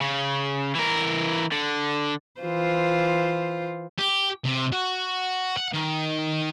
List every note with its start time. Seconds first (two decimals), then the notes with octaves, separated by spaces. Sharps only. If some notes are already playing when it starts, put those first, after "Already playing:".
0.02 C#3
0.75 E3 A#4
1.52 D3
2.41 E3 F4 C5
3.98 G4
4.45 C3
4.73 F#4
5.57 F#5
5.74 D#3